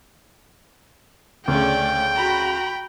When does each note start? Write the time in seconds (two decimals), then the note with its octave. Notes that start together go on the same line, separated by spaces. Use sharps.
1.48 D2 C#3 A3 C#4 D5 G5
2.16 F#4 A#5 B5